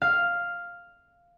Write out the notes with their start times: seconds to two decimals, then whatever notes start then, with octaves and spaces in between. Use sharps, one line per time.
0.02 F5